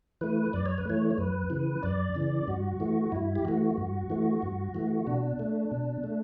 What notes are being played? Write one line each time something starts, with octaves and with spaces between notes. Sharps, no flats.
E3 A3 B4
F#2 D5
C#5
B4
E3 A3 C#5
C#5
F#2 B4
C#3 E3
F#2 D5
C#3 E3
G2 F#4
E3 A3
G2 E4
G4
E3 A3 F#4
G2
E3 A3
G2
E3 A3
B2 D4
A3
B2
A3